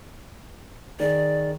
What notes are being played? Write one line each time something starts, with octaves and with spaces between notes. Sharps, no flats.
D#3 G#4 D5